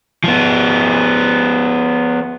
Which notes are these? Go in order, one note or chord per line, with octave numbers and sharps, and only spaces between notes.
F3 B3